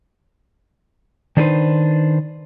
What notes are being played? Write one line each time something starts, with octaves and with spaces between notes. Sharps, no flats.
D#3 D4 D#4 G4 B4 C5